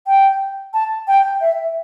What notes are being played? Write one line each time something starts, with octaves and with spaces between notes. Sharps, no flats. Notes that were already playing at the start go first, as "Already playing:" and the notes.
G5
A5
G5
E5